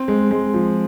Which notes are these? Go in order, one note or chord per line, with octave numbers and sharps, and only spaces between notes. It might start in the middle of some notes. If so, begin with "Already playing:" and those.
Already playing: C4
G#3
G#3
F3